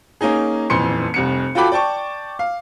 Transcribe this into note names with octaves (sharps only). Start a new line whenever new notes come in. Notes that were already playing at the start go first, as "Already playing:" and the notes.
A#3 C#4 D#4 G#4
D#1 F2 E3 C6 C#7
F1 C2 C#7
F4 F#4 A4 G5 B5 D6
D5 G5 A5 C#6
F5